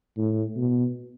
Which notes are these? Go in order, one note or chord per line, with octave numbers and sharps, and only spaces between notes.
A2
B2